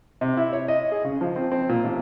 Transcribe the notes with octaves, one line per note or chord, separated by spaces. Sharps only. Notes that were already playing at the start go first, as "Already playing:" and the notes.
C3
E4
C#5
D#5
G#4
C#3
F3
C4
C4
A#2
A1